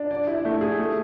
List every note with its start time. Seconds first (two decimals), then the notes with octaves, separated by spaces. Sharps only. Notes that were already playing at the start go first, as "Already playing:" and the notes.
Already playing: D4
0.11 D5
0.27 E4
0.45 A3
0.61 G#4
0.79 A3